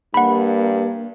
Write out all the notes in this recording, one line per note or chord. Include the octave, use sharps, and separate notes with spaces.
G2 A#3 F#5 B5